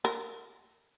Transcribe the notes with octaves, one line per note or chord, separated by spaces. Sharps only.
A#4